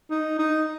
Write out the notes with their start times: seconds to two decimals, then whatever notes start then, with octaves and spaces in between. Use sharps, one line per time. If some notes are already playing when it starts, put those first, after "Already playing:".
0.10 D#4
0.39 D#4